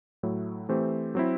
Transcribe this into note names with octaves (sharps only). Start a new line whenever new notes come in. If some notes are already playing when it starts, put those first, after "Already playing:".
A2 F#3 A3 E4
E3 A3 C4 G4 C5
F#3 C4 E4